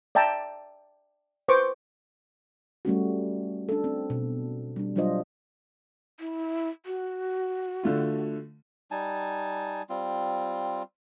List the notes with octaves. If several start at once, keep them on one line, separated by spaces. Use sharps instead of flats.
D5 E5 G5 A5 A#5
B4 C5 C#6 D6
G3 A3 C#4 F#4
D4 A4
C4
B2
G3 D4
F#3 G3 D4 F4 C5 D#5
E4
F#4
D3 A3 F4
G3 D#4 G#5 A5
G3 C4 F4